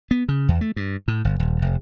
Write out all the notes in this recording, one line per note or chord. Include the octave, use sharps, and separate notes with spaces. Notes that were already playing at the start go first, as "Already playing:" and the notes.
B3
C#3
E2
A3
G2
A2
G1
D#1
F1